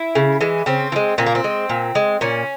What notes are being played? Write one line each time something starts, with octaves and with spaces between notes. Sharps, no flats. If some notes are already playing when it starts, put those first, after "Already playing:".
Already playing: E4
C#3
E3 G#3
C#3 C4
E3
G#3
A#2 C4
A#3
C4
G#3
A#2
G#3
A#2 C#4